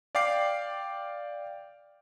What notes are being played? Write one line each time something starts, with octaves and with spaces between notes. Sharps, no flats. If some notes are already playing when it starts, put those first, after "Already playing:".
D5 F5 G5 D6 C7